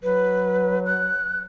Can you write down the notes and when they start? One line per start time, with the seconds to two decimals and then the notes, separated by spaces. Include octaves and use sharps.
0.03 F#3 B4
0.86 F#6